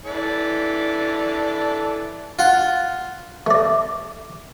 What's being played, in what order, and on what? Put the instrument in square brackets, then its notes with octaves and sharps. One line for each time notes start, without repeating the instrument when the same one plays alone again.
[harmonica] E3 A4 D5
[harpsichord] F4 F#5
A3 D5